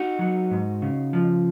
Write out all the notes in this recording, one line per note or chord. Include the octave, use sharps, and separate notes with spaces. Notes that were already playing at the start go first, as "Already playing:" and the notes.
Already playing: D#4 F#4
F#3
G#2
C#3
F3